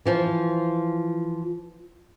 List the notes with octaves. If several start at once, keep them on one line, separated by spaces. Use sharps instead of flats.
E3 F3 F4